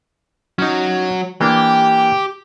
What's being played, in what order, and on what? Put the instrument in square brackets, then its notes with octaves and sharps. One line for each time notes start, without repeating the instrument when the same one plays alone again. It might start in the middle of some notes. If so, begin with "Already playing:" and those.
[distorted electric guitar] F#3 [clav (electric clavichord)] C#4 D#4
[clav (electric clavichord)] E3 A#3 D4 [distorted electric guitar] G4